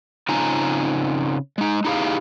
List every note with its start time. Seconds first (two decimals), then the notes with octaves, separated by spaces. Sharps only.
0.29 C#3 C4 D#4 F4 G#5 A#5
1.58 G#3 D#4
1.85 D#4 E4 G4 G#4 F5